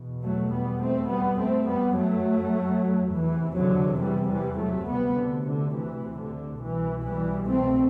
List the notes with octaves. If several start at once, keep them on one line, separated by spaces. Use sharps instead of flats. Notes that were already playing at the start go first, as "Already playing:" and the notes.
Already playing: E2 B2
F#3 A3
G3 B3
A3 C4
G3 B3
F#2 A3 C4
G3 B3
F#3 A3
E2 C3 E3
D3 F#3
E3 G3
E3 G3
F#3 A3
D2 C3 G3 B3
D3
D3
E3
D3
C2 B2 E3
E3 G3
A3 C4